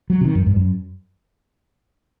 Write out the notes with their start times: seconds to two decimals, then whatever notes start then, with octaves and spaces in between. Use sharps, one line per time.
0.10 F#3
0.21 C3
0.25 D#3
0.35 F#2
0.46 G2
0.56 F#2